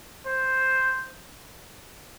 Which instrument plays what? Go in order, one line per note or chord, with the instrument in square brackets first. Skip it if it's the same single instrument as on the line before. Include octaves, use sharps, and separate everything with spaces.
[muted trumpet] C5